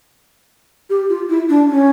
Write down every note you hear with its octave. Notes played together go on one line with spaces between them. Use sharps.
G4
F4
E4
D4
C#4